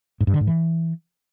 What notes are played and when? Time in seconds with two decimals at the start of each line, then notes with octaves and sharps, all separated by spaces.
0.20 G#2
0.27 G2
0.34 D3
0.41 G#2
0.47 E3